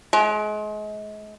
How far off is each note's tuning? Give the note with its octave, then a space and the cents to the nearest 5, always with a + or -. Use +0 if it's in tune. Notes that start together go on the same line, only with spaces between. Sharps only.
G#3 +35